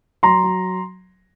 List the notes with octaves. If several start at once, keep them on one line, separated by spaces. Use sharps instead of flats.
F#3 A#5 C6
F#3